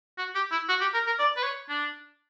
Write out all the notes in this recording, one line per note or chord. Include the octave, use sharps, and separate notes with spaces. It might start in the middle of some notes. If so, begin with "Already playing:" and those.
F#4
G4
E4
F#4
G4
A#4
A#4
D5
B4
C#5
D4